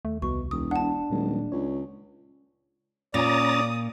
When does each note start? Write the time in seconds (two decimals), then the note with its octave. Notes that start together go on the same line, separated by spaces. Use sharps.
0.05 D#2 A3
0.22 C2 B2 C#6
0.51 E1 D#6
0.71 D4 F#5 A5
1.10 D#1 A#2 F#3 G#3
1.52 C#2 C#5
3.14 A#2 C#4 D5 A#5 D#6 A6